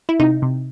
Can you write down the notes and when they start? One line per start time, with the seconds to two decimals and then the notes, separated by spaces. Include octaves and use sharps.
0.09 E4
0.20 C3 D#4
0.42 C3